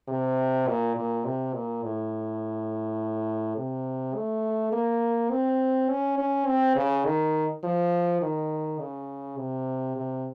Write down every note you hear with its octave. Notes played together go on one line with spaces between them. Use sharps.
C3
A#2
A#2
C3
A#2
A2
C3
A3
A#3
C4
C#4
C#4
C4
C#3
D#3
F3
D#3
C#3
C3
C3